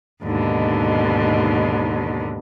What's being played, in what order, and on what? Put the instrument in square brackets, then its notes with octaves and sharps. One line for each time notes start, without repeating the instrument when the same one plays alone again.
[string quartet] D#2 G#2 B2 D3